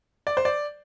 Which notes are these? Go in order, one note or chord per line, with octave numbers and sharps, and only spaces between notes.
D5
C5
D5